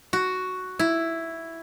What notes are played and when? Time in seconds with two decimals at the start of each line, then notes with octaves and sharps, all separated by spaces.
0.13 F#4
0.79 E4